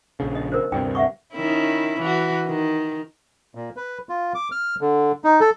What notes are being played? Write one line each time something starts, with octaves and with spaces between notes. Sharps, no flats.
A#1 C#3
D#5
A#4 C5
D2 G2 C3 D4 F4 G5
E5 F#5 C#6
D#3 C#4 E4
E3 F#4
D#3
A#2
B4
F4
D6
F6
D3
D#4
A4